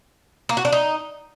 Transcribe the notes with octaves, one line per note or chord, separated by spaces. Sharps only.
A#3
F#4
D4
D#4